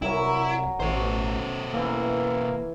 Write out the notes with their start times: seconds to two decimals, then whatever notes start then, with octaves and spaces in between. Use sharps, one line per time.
0.02 C2 F#3 E4 A#4 G#5
0.80 A1 B2 A3 C#4 C5
1.74 E3 A#3 E4